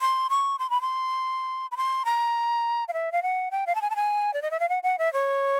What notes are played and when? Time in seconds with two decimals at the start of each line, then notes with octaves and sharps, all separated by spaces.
0.01 C6
0.30 C#6
0.59 C6
0.70 B5
0.81 C6
1.72 B5
1.77 C6
2.05 A#5
2.88 F5
2.93 E5
3.12 F5
3.23 F#5
3.51 G5
3.67 F5
3.75 A5
3.82 G#5
3.90 A5
3.96 G#5
4.34 D5
4.42 D#5
4.51 E5
4.60 F5
4.69 F#5
4.83 F#5
4.99 E5
5.13 C#5